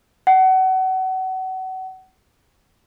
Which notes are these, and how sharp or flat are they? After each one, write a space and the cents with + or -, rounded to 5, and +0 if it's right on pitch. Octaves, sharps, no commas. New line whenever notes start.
F#5 +30